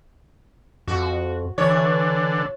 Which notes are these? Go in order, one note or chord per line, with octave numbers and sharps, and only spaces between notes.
F2 F#4
D3 E3 C#5